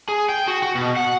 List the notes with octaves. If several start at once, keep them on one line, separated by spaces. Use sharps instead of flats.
G#4
G5
F#4
F#4
B2
F#5